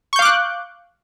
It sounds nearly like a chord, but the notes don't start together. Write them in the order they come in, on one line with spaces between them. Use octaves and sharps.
C#6 G6 F5 D6 F#6